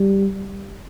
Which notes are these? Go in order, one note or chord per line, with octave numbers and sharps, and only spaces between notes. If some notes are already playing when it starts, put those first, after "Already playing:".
Already playing: G3